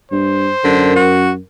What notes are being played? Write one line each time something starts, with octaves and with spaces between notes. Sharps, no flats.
G2 C5
F#2 D3 A#4
F#4